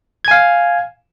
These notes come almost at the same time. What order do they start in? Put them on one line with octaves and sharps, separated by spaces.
G#6 G#5 F5